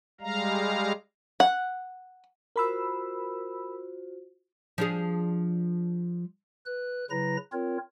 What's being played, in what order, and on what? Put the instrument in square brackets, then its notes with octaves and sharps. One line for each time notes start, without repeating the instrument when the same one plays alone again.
[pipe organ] G3 G#3 F5 A#5
[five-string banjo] F#5
[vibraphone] F4 F#4 C5 [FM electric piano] A#4 B5 E6
[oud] F3 D4 G#4
[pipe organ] B4 F#6
C#3 F#3 E4 B4 A#5 A#6
C4 F4 A#4 C#5